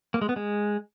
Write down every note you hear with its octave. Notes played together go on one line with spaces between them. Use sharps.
A#3
G#3
B3
G#3